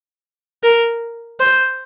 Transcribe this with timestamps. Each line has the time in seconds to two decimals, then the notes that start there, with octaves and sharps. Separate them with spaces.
0.63 A#4
1.40 C5